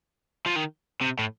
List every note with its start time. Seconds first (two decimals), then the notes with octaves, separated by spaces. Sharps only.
0.46 F3
0.56 D#3
1.02 C3
1.19 A2